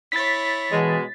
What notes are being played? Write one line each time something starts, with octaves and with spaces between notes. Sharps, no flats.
E4 C#5 A6 B6
B2 E3 G#3